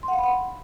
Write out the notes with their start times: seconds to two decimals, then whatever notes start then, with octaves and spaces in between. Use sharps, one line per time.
0.03 C6
0.08 F#5
0.13 F5
0.18 B5
0.24 F#5